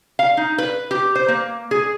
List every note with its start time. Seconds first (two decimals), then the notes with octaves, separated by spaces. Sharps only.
0.19 F5
0.37 D#4
0.58 B4
0.91 G4
1.15 C5
1.28 A#3
1.71 G#4